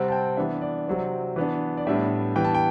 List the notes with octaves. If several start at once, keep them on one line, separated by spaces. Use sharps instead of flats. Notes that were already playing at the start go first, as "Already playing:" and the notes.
Already playing: C3 G3 C4 F#5
A5
G5
E3 B3 D4 E5
D5
C3 F#3 C4
E3 B3 D4
D5
A2 G3 B3 D4 E5
E3 G3 B3 G5
A5
G5